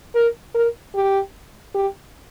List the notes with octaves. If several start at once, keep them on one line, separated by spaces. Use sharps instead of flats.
A#4
A#4
G4
G4